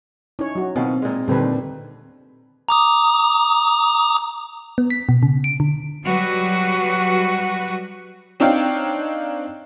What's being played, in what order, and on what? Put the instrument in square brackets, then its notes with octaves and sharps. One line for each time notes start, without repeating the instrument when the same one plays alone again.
[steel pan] C#4 C#5 [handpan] D#4 E4
[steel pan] F#3 F#4
[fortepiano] B2 D#3 F4 [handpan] C4
[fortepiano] A#2 G#3
[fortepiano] D#2 A3 [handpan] A#2 D3 [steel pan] G3 C4 B4
[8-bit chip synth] A#5 D6 D#6
[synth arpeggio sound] B3
B6
B2
C#3
D7
D3
[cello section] F#3 G3 F#4 B4
[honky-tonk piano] C4 D4 D#4 C#5 F5 G5